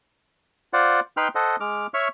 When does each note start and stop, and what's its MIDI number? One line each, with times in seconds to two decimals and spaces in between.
0.73 1.00 65
0.73 1.00 72
0.73 1.00 74
0.73 1.00 78
1.17 1.28 63
1.17 1.28 71
1.17 1.28 79
1.17 1.28 83
1.17 1.28 84
1.17 1.28 89
1.35 1.56 69
1.35 1.56 72
1.35 1.56 75
1.35 1.56 78
1.60 1.87 56
1.60 1.87 86
1.60 1.87 89
1.94 2.08 73
1.94 2.08 76
1.94 2.08 85
1.94 2.08 89